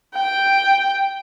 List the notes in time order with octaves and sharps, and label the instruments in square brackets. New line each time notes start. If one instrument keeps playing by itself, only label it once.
[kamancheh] G5